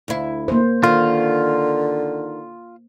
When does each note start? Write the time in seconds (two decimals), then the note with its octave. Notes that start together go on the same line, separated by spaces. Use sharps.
0.08 D2 E4
0.48 A#3 C5
0.84 D3 D#3 F4